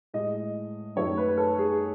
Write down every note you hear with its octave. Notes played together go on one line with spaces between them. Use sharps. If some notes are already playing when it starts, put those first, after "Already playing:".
A2 G#3 D#5
F#2 D#3 A3 C#5
B4
B4
A4
G#4